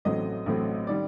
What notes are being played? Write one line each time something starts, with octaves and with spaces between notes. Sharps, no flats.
A1 A2 F#3 A3 C4 D#5
A1 A2 F#3 A3 C4
D#3 G3 D5